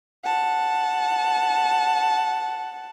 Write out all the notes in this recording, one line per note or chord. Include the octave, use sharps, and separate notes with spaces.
F#5 A5